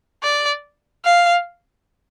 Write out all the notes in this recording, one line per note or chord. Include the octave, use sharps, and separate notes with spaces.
D5
F5